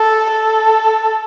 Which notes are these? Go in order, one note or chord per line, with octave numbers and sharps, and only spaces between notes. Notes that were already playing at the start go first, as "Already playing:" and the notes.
Already playing: A4
A4